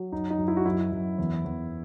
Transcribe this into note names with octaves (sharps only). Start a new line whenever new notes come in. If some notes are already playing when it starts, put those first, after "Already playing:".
Already playing: F#3
F#2 D#4
D#4
F#2
E4
F#4
F#2 E4
F#2
E2
E2